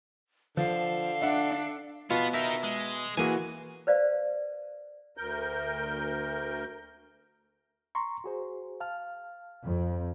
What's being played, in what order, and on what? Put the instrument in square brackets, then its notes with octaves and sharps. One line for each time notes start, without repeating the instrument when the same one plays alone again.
[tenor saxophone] D3 [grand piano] F3 [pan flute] F5
[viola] D4 [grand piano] E5 F#5
[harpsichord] B2 [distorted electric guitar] B3 [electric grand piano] F4
[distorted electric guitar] D#4 A#4 [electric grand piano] E5
[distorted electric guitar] G#3
[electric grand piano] E3 A#3 F#4 [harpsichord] G#4 G#5
[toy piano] B4 C5 D5 F5
[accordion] D2 A#4 G6
[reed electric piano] A#5 C6 C#6
F#4 G#4 C5
F5 A5 F6
[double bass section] F2